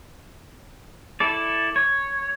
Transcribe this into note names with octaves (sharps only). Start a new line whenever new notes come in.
E4 A4 D5
C#5